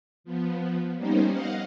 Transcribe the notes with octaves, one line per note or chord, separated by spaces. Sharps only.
F3 B3
G3 A#3 B3 C#4 D#4 C5
D#5 F5 F#5